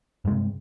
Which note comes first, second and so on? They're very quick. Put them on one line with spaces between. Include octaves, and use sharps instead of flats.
G2 G#3 C3